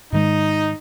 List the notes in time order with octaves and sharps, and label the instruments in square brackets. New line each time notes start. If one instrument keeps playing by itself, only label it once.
[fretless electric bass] G#2 D#3 G#3 [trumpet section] D#4